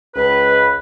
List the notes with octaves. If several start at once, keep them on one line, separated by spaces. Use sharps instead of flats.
C#2 B4